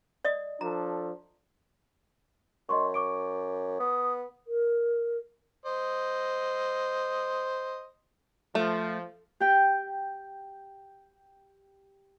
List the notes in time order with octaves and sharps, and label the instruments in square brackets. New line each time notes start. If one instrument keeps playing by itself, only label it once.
[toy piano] D5 D#5 D#6
[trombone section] F3 D4 A4 [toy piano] A#5
[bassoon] F#2 [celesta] D#5 C6 C#6
[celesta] C#6 D6 D7
[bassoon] B3 [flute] D#6
[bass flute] A#4
[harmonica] C5 D#5
[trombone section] F3 [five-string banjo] A3
[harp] G4 G5